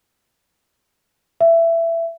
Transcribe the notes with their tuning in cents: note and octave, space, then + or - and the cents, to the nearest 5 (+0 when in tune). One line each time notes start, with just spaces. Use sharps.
E5 +15